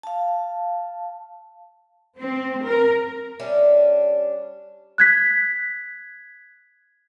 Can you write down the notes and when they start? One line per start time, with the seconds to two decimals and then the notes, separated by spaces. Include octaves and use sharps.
0.03 F5 A5
2.18 C4
2.65 A#4
3.39 G3 C#4 D4 E5
4.98 F#6 G#6 B6